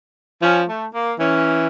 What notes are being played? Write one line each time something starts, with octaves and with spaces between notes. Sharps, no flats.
F3 C#4
A3
A#3
E3 C#4